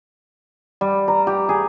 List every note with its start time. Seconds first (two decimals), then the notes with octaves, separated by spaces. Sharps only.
0.81 G3
1.08 A#5
1.27 G4
1.49 G#4